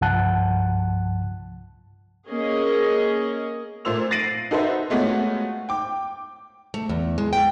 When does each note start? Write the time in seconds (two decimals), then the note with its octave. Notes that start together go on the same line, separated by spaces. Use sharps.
0.01 C2 G2 F3 F#5 A5 F#6
2.28 A#3 C#4 G#4 D#5
3.85 A#2 A3 F4 C5 E6 F7
4.11 A6 A#6 C7 D7 D#7 F#7
4.51 D#4 F#4 A4 B4 C5 E5
4.90 G#3 A3 B3 F4 F#4 C#5
5.69 G5 D6
6.74 A3
6.89 E2
7.18 G#3
7.33 G5